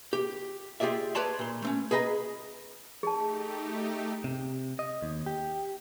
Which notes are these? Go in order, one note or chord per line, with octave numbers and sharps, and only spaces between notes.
G4
F4 G4 G#4 D5 E5
B4 C#5 D5 A5 C6
A#2 C6
A3 C4 C#4
G#4 B4 D#5 F#5 A#5
A3 D#4 G4 G#4 A5
C3
D#5
D#2
G4